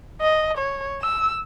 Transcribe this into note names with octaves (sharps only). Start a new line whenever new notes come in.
D#5
C#5
E6